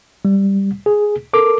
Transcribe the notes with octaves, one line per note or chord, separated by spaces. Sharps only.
G3
G#4
A4 A#4 D6